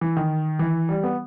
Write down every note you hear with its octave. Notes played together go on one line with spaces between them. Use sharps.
E3
D#3
E3
G3
B3